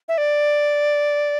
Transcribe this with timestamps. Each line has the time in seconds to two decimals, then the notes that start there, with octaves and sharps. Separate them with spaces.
0.09 E5
0.18 D5